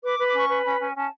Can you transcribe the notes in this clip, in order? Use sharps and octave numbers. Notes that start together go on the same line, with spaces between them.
B4 D6
B4
D6
C#4 C#6
B4
C#4 B5
C#4 G#5
C#4 A5